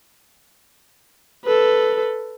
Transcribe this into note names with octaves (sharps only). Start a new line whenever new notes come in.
A4 B4